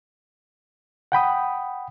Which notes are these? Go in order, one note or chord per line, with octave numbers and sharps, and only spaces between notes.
F#5 G5 B5 D#6